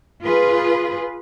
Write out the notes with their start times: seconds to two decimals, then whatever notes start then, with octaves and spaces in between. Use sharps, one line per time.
0.23 F4 G#4 B4